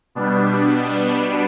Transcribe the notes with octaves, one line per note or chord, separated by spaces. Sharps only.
B2 G3 B3 D4